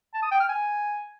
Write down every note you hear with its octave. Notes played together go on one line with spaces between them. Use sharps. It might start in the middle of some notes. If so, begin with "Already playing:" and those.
A5
D#6
G5
F6
G#5